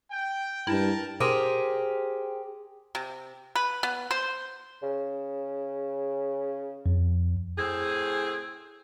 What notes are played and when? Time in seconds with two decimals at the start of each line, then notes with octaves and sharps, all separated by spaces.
0.11 G5
0.67 G2 E4 A#4 G5 A5
1.20 G4 G#4 A#4 C5
2.95 C3
3.55 B4
3.83 B3
4.11 C5
4.82 C#3
6.86 F2
7.57 A2 C4 G#4